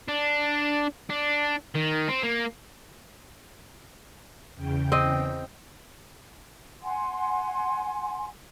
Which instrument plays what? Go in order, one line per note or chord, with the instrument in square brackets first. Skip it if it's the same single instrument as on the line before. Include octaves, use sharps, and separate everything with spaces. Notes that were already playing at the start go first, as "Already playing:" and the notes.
[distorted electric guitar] D4
D4
D#3
C4
A#3
[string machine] E2 C#3 G5
[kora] C4 D#5
[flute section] F#5 G#5 C6